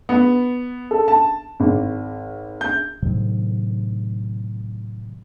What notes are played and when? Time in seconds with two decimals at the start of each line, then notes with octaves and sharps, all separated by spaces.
0.09 B3
0.91 A4
1.08 A5
1.60 G#1
2.61 G6
3.02 A2 C3 D#3 F#3